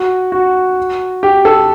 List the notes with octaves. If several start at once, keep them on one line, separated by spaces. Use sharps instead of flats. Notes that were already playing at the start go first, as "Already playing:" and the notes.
Already playing: F#4
F#4
G4
A4